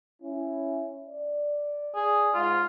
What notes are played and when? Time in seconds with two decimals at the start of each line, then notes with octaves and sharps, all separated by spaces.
0.22 C#4 E4
1.08 D5
1.95 G#4
2.35 G#2 F4